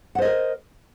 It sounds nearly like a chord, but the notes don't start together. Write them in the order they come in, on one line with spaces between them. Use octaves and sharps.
F#5 C5 D#5 A#4